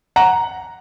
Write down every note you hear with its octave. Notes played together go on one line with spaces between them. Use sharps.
F#5 A#5